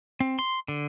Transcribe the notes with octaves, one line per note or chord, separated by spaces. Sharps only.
C4
C6
D3